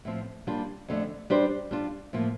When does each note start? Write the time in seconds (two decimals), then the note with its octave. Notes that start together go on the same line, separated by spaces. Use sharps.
0.05 A2 F3 C4
0.47 G3 A#3 D4 F4
0.88 F2 D3 A3
1.30 G3 D4 G4 C5
1.71 G3 D4 F4
2.13 A2 F3 A#3